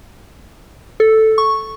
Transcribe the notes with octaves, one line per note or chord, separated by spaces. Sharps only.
A4
C#6